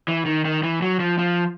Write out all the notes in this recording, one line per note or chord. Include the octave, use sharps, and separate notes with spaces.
E3
D#3
D#3
E3
F#3
F3
F3